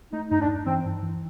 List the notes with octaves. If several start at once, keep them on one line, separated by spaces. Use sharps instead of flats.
A3 D#4
G2 D#4
D4
G2
E3 C4
G2
E3